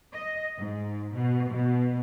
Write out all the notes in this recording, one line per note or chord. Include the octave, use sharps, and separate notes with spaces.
D#5
G#2
B2
B2